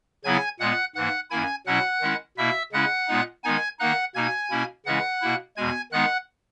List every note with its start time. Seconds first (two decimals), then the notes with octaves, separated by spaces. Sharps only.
0.24 C#3 F#3 B3 E4 G#5 G#6
0.60 A#2 G#3 B3 F#5 F#6
0.95 G#2 E3 A#3 F#5 F#6
1.31 F#2 D#3 A#3 E4 G#5 G#6
1.66 B2 F#3 C#4 E4 F#5 F#6
2.01 D#3 G#3 C#4 E4
2.37 B2 A#3 E4 E5 E6
2.72 C#3 G#3 C#4 E4 F#5 F#6
3.08 A#2 G#3 B3 D#4
3.43 D#3 G#3 B3 D#4 G#5 G#6
3.79 D#3 A#3 D#4 F#5 F#6
4.14 B2 A#3 D#4 G#5 G#6
4.51 B2 A#3 C#4 E4
4.86 C#3 E3 G#3 C#4 E4 F#5 F#6
5.22 B2 A#3 E4
5.56 E2 B2 G#3 G#5 G#6
5.92 D#3 G#3 B3 D#4 F#5 F#6